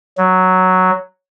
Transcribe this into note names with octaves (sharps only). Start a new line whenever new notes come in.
F#3